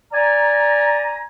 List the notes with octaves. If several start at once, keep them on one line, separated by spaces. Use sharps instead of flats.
D5 G#5 A#5